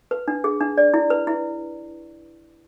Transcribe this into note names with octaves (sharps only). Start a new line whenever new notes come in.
B4
D4
G#4
D4
D5
E4
B4
E4